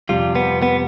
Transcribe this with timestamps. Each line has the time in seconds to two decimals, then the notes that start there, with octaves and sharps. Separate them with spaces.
0.09 F2 C3 G3 F4
0.35 B3
0.62 B3